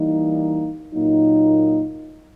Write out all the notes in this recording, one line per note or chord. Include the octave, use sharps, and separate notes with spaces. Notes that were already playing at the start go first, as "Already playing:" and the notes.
Already playing: E3 G3 A#3 D#4
A#2 F#3 A#3 D#4